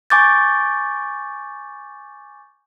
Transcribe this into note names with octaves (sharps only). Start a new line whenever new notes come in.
G#5 C#6 D6 G6 A6